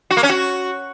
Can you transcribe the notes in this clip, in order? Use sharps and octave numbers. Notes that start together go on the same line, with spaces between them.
F#4
A#3
C#4
F#4